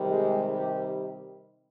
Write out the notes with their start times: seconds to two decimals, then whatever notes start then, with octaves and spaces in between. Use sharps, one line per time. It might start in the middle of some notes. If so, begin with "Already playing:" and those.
Already playing: C3 D#3 G3
0.10 G#3
0.50 G4